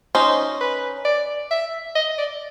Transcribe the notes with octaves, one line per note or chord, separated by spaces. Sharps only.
C#4 D#4 C5
B4
D5
E5
D#5
D5